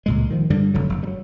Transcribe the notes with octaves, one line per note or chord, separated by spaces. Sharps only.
C#2 A#2 G#3
D#3 F3
G2 D3 G3
F1 D3 F#3
F#1
F#3 G3